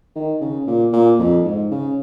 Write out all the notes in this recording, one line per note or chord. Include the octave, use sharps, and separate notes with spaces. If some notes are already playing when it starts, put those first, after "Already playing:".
D#3
C#3
A#2
A#2
F2
G#2
C#3